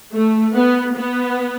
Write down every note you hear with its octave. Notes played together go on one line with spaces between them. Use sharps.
A3
B3
B3